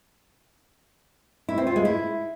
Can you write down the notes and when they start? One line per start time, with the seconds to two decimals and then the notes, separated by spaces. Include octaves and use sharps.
1.49 E4
1.58 C4
1.67 F4
1.76 G#3
1.85 E4